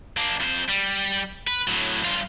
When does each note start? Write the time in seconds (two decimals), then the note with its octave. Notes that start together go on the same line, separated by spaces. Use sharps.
0.17 A#3 D4
0.40 F2 C5
0.69 G3
1.48 B4
1.68 A2 F#3
2.04 G2 F4